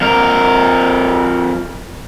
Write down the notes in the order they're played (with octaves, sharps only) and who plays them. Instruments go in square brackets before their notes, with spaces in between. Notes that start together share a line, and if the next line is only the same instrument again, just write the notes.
[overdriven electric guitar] F2 A#4